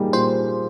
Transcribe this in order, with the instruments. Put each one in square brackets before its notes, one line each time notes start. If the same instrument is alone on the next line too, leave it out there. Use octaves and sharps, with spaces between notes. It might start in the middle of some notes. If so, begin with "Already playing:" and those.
Already playing: [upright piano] A#2 G3 A#3 D#4 G#4
[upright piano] A#2 [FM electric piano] C5